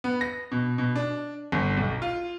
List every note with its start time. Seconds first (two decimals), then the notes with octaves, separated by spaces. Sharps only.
0.04 B3
0.21 A#6
0.52 B2
0.78 B2
0.96 D4
1.52 G1
1.77 B1
2.02 F4